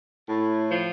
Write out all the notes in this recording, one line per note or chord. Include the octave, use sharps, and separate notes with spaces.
A2
F3